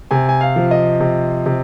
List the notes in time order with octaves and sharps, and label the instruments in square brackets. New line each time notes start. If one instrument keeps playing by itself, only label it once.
[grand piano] C3 G#5
G#5
F5
F3
D#5
C3
C3